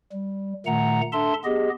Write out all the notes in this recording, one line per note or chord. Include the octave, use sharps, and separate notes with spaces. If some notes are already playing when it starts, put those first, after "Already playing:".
G3
A#2 D#3 A3 F#5 A#5
D4 A4 E5 A5 C6
B3 G4 G#4 D#5